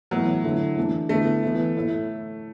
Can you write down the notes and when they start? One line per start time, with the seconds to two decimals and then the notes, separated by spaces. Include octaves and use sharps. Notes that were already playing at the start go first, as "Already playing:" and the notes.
0.11 A2 E3 F#3 B3 E4
0.44 D3 F#3 A3 E4
0.77 E3 A3 D4
1.09 D3 A3 B3 E4
1.43 E3 B3 E4
1.76 A2 A3 E4